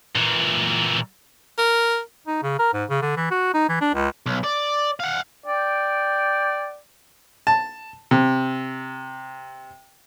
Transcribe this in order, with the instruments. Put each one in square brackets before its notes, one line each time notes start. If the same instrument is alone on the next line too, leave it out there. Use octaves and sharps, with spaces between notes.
[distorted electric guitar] A#2 E3
[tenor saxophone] A#4
[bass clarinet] D#4
C#3
A#4
G#2
C#3
D3
E3
F#4
D#4
E3
D4
C#2
[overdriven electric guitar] B1
D5
F5 F#5
[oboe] D5 [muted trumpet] G5
[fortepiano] A5
C3